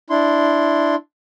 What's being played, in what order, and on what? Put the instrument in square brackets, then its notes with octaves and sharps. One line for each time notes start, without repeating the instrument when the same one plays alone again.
[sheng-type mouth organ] D4 E4 C6